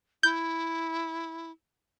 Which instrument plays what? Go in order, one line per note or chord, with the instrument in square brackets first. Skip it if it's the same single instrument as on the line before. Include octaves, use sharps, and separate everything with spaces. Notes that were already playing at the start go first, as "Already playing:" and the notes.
[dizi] E4 [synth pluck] G6